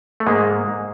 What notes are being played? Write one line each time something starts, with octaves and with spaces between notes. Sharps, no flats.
A3
G#2 G#3 A#3
G#2